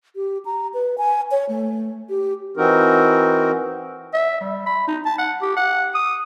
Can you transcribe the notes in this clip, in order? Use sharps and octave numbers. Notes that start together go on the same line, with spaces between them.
G4
A#5
B4
G#5
C#5
A3
G4
E3 C4 D#4 F#4 A#4
E5
G3
B5
D#4
A5
F#5
G4
F#5
D#6